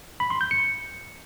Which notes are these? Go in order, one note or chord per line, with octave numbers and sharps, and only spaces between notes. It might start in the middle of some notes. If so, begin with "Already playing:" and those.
B5
C6
G6
C#7